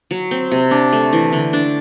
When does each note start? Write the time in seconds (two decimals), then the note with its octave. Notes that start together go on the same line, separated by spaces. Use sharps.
0.11 F#3
0.31 C4
0.51 C3
0.71 D4
0.93 A3
1.13 E3
1.33 D3
1.53 D4